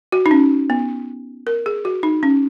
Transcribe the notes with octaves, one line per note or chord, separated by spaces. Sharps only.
F#4
D#4
C#4
B3
A#4
G#4
F#4
D#4
C#4